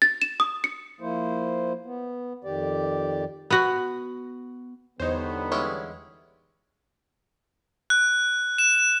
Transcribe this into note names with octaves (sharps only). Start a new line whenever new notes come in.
A6
E7
D#6
C#7
F3 A#3 E4 C5
B3
F2 D#3 G4 D5
B3 F#4
E2 D3 G3 B3 D#4 C5 C#5
G#3 C#4 E4
F#6
E7